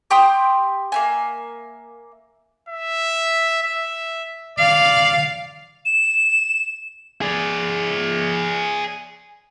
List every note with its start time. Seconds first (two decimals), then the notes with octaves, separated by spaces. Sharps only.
0.10 G4 G5 C6 D#6
0.92 A#3 E5 G#5
2.69 E5
3.63 E5
4.59 D5 F5
5.85 E7
7.22 G#4 D5